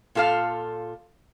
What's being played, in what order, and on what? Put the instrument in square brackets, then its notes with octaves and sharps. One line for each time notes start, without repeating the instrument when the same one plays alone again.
[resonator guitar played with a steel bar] A#2 F4 A4 A#4 F5